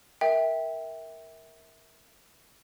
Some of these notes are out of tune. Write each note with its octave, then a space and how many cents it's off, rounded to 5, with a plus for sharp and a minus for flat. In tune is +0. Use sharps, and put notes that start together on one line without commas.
A#4 +0 E5 -25 G5 +10